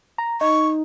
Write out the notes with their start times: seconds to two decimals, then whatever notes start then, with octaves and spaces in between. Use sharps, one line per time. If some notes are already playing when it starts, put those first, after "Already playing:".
0.18 A#5
0.41 D#4 C#6